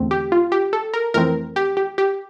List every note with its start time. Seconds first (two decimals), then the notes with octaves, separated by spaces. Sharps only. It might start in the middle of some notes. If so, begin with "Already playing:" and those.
Already playing: E2 D3 A3 C4
0.11 G4
0.32 F4
0.52 G4
0.73 A4
0.93 A#4
1.14 F2 E3 A3 C4 A#4
1.56 G4
1.77 G4
1.98 G4